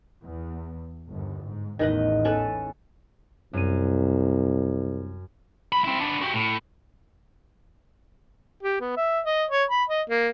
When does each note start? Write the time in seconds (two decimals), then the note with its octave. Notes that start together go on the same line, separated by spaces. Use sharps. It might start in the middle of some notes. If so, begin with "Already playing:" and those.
0.24 E2
1.08 G1 D#2
1.43 G#2
1.79 A1 E2 D#3 B4 D#5
2.25 C#4 A4 B4
3.53 C2 F#2 D#7
5.72 C2 B5
5.84 C4 E4
5.99 B3 D4
6.22 F#4 G4
6.33 A2
8.63 G4
8.80 B3
8.97 E5
9.25 D#5
9.51 C#5
9.70 B5
9.89 D#5
10.09 A#3